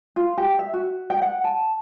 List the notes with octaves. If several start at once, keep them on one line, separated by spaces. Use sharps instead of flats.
F4
G4
E5
F#4
G5
F#5
A5